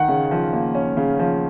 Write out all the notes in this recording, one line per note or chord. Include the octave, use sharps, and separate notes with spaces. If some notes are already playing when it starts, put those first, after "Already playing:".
Already playing: D#3 F#5
C#3
F3
A#3
C#4
C#3
F3